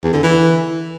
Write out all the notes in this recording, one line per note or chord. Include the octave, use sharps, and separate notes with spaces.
E2
D3
E3